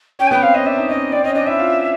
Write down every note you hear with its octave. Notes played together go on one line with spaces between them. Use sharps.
C#4 G5
G#5
B3 G5
C4 F5
C#4 D#5
D4 E5
D#4
C#4 D#5
C4 D5
C#4 D#5
D4 D#5
E4 E5
F4